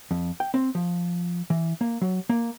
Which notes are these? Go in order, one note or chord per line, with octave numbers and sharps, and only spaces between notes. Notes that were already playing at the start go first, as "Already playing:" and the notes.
F2
G5
C4
F3
E3
A#3
F#3
A#3